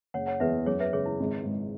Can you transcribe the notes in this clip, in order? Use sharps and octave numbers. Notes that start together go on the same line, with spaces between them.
F#1 C#5 F#5
C#5 F#5
E2 B4 E5
F#2 G#4 C#5
B4 E5
C#3 G#4 C#5
E4
G#1
G#2